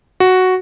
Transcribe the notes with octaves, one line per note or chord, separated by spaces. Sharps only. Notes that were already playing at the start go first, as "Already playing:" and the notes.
F#4